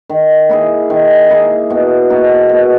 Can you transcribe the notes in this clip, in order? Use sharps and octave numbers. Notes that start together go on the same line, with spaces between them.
D#3
A#3 E4 G#4
D#3
A#3 E4 G#4
B2
A#3 D#4 F#4
B2